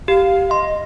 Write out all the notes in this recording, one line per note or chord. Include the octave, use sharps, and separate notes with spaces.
G4 F5
D#5 C6